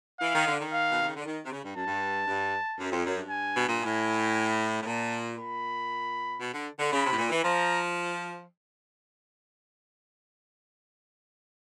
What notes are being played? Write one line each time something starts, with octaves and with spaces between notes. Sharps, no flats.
E3 F5
D#3
D3
D#3
F5
B2
C3
C#3
D3
D#3
C3
C#3
G2
F#2 A5
G2
G2
F#2
F2
F#2
G2
G#5
B2
A#2
A2 G#5
A2
A#2 A5
A#2 B5
B2
D3
D3
C#3 B5
C3
A2
A#2
E3
F3 A#5